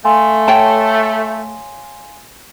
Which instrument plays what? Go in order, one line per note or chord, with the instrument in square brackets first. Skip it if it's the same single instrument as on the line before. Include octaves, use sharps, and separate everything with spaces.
[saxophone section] A3 [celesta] F5 G#5 C6
[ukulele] C#5 G5 A5